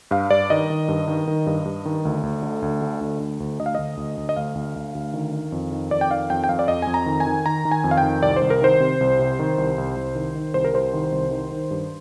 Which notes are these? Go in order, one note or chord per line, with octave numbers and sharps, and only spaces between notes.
G2 F5
G2 D5
D#3 D#5
D#3
G2
D#3
D#3
G2
G2
D#3
D2
D2
D3
D2
D3
D2
D2
D2
D2 D#5
F5
D2 D#5
D2
D2
D#5
D2 F5
D2
D2
D2
D#3
D#3
F2
D#3
F2 D5
G5
D#3 F5
F2 G5
G5
F2 F5
D5
F2 D#5
F2 G#5
A#5
D#3
G#5
D#3
D#3 A#5
D#3
G#5
F2
F5
G5
D#3
C2 D5
C2 C5
A#4
D#3 C5
C3
C2
C3
D#3
C2
C2
C2
D#3
D#3
C2 C5
A#4
C2 C5
D#3
C2
D#3
D#3
G2